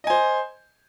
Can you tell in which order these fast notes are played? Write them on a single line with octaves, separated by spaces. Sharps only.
D#5 G#5 C5